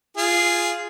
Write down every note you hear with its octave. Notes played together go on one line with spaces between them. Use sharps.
F4 G#4